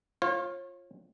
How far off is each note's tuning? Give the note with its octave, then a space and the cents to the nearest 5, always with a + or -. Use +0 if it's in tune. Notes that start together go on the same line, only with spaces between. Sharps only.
F4 +0 C#5 -35